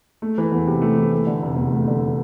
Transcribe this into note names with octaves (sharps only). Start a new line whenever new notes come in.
A3
E3
E2
C3
A3
E3
A3
D3
F1
E2
A3
D3